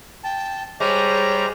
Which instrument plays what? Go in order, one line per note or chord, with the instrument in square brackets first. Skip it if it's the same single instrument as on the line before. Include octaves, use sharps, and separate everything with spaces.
[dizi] G5 [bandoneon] A5
[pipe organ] G3 A#5 A#6 [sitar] G#3 [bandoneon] G4 C5 [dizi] C#5